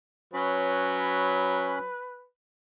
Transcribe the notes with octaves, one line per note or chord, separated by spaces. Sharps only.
F#3 C#4 B4 B5